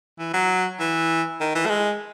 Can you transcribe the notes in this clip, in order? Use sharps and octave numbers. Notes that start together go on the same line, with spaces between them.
E3
F#3
E3
D#3
E3
A3
G#3